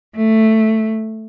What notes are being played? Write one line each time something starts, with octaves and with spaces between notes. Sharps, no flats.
A3